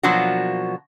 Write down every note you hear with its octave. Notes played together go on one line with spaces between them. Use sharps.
B2 F3 F#3 A#3 D4 F#4